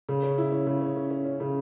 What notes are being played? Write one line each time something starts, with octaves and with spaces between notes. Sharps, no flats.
C#3
C#4
E4
C#4
C#3
C#4
C#4
C#4
C#4
C#3